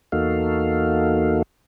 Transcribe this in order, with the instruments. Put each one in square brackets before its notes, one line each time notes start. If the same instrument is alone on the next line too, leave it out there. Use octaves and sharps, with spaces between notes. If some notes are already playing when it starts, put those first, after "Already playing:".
[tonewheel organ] E2 A#3 D#4 F#4 A4 F5